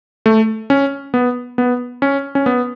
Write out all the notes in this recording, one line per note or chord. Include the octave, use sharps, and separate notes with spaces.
A3
C#4
B3
B3
C#4
C#4
B3